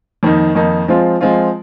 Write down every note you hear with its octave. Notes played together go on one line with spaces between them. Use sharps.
F2 D#3 A#3 D#4
F2 D#3 A#3 D#4
F3 G#3 C4 F4
F3 G#3 C4 F4